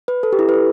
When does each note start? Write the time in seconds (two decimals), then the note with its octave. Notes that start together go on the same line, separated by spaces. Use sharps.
0.08 B4
0.23 A4
0.33 G4
0.39 E4
0.49 B4
0.54 A4